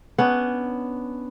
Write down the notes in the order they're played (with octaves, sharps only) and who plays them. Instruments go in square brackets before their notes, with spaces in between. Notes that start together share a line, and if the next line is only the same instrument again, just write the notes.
[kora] B3 C#4 D4